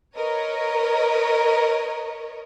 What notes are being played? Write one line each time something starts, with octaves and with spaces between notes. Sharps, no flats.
A#4 B4 C#5 D#5